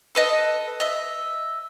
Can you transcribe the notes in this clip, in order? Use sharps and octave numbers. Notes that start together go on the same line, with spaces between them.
A4 B4 D#5
D#5 E5